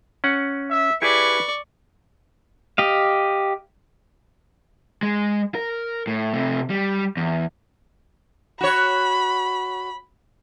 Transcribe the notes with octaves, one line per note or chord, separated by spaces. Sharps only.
C#4 F#5
E5
E4 G4 G#4 B4 D5 C#6
G4 D#5 F5
G#3
A#4
A2
C3 A3
G3
E2
F#4 C#5 B5